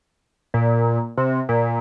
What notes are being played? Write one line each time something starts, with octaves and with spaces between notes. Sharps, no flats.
A#2
C3
A#2